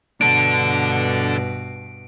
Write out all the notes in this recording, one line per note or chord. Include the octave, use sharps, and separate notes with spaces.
G2 B2 D4 A4 D7